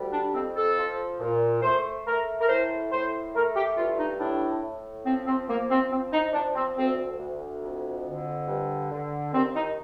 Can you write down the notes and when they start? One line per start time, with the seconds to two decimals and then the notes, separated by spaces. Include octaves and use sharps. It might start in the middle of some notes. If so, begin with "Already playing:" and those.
Already playing: D2 G3
0.13 D4
0.34 F2 C4
0.56 A4
0.78 F3
1.20 A#2
1.63 A3 C5
2.06 A3 A#4
2.41 A#4
2.48 A2 C5
2.92 A2 C5
3.35 A3 A#4
3.56 G4
3.77 G2 F4
3.99 D#4
4.19 A2 D4
4.63 A2
5.06 F3 C4
5.27 C4
5.48 F3 A#3
5.70 C4
5.91 F3 C4
6.12 D#4
6.33 F3 D4
6.56 C4
6.76 D2 C4
7.19 D2
7.62 F2
8.05 D3
8.48 G2
8.91 D3
9.33 D#2 C4
9.55 D#4